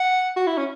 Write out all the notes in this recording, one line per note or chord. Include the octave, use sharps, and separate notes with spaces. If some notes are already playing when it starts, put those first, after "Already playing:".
Already playing: F#5
F#4
E4
C#4